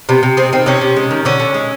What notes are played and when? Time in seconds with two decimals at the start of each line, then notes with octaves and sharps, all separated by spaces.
0.09 C3 B3
0.23 C3
0.37 G#3 C4
0.53 D#3 C4
0.66 C3 C#4
0.81 C3
0.96 G#3
1.11 D#3
1.25 D3 C#4
1.40 D3
1.54 G#3